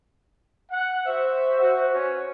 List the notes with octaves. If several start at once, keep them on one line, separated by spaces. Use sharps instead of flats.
F#5
F#4 C5 E5
F#4
C#4 B4 C#5